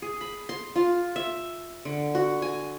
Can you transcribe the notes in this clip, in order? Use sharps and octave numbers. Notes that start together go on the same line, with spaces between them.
G#4
B5
C6
F4
E5
D3
F#4
G#5